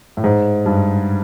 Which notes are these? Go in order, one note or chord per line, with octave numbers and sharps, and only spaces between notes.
A2
G#2
G2